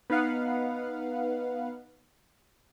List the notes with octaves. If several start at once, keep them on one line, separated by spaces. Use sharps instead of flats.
B3 D#4 B4 F5 F#5